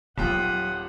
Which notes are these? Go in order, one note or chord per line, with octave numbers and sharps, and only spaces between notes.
D#1 F#3 F4 G4 F#5 D#6